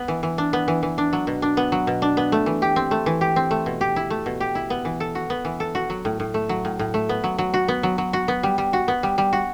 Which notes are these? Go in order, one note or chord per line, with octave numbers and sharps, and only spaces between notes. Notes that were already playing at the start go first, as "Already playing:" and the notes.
Already playing: B3
E3
E3
D4
B3
E3
E3
D4
F#3
B2
D4
B3
F#3
B2
D4
B3
A3
E3
G4
C4
A3
E3
G4
C4
A3
B2
G4
E4
A3
B2
G4
E4
B3
E3
A4
F#4
B3
E3
A4
F#4
F#3
A2
A2
A3
F#3
A2
A2
A3
B3
F#3
F#3
F#4
B3
F#3
F#3
F#4
B3
G3
G3
F#4
B3
G3
G3
F#4